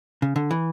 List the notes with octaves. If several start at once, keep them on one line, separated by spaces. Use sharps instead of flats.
C#3
D3
E3